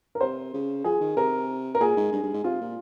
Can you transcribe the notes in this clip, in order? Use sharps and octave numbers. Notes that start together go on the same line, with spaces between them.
A#4
C3 C5
C#3
F3 G#4
D#3
C3 A#4
A#4
A#2 G#4
G#2
G2
G2
G#2
C3 F4
A#2